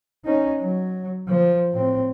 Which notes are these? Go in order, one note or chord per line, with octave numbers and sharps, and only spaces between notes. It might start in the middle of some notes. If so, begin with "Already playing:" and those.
C#4 D#4
F#3
F3
A2 C4